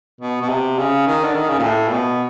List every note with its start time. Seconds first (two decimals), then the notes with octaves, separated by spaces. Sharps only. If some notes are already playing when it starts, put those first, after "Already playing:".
0.21 B2
0.41 B2
0.49 C3
0.79 C#3
1.07 D#3
1.24 D3
1.35 D#3
1.49 C#3
1.59 A#2
1.64 A2
1.88 A#2
1.92 B2